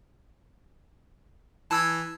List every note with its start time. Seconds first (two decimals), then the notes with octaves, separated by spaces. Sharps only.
1.71 E3 A5 E6 G#6